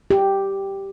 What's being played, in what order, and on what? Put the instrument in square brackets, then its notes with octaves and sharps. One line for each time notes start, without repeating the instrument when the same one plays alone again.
[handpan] G4